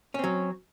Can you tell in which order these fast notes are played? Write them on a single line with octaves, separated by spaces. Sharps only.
C#4 C4 F#3